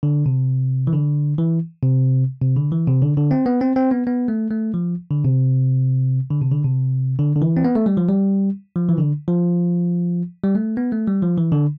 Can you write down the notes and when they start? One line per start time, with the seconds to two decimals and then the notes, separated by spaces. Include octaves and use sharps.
0.03 D3
0.26 C3
0.87 E3
0.93 D3
1.38 E3
1.83 C3
2.42 C3
2.56 D3
2.72 E3
2.87 C3
3.02 D3
3.17 D3
3.31 C4
3.46 B3
3.61 C4
3.76 C4
3.91 B3
4.07 B3
4.28 A3
4.51 A3
4.74 F3
5.10 D3
5.25 C3
6.30 D3
6.41 C3
6.52 D3
6.64 C3
7.19 D3
7.36 D3
7.42 E3
7.57 C4
7.64 B3
7.75 A3
7.86 G3
7.97 F3
8.09 G3
8.76 F3
8.89 E3
8.98 D3
9.28 F3
10.43 G3
10.55 A3
10.77 B3
10.92 A3
11.08 G3
11.22 F3
11.38 E3
11.52 D3